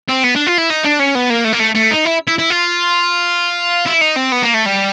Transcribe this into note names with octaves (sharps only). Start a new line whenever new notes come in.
C4
B3
D4
F4
E4
D#4
D4
C#4
B3
A#3
A3
A#3
A3
A3
D#4
E4
E4
E4
F4
E4
D#4
C4
B3
A#3
A3
G3